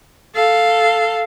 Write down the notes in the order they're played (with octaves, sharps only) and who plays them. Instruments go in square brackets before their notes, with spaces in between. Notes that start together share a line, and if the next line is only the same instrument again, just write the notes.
[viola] A4 F5